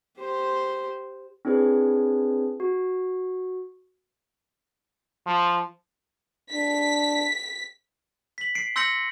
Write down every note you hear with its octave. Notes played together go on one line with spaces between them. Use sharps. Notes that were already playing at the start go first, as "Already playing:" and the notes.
G4 C5
C4 D4 E4 G#4 B4 C#5
F#4
F3
D4 B6
B6 F#7
C7 D7
C6 E6 G6 A#6 C#7 F#7